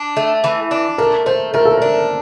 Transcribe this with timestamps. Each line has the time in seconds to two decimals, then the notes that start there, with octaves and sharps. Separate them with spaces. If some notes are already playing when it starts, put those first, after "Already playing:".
Already playing: D4
0.16 A3
0.44 E3
0.71 D4
0.98 A3 A#4
1.26 A3 C5
1.54 A3 A#4
1.65 A4
1.78 D4 A#4